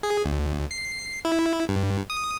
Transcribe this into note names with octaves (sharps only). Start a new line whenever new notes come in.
G#4
D2
C7
E4
G2
D#6